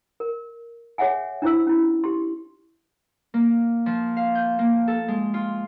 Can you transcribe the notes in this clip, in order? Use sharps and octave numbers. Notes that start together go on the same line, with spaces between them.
A#4
G#4 C#5 E5 F#5 G#5
D4 E4 C5 E6
C#4 E4
G4 C6
A#3
F3
F5
G6
A#3
A4
G#3
F4